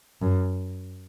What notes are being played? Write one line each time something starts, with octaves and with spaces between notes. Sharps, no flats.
F#2